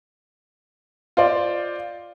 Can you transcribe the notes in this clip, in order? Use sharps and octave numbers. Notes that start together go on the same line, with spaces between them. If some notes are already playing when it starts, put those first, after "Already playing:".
F4 C5 D5 D#5